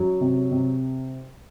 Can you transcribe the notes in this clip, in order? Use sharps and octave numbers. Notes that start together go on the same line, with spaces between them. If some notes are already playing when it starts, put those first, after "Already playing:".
Already playing: F#2 F#3
C3
C3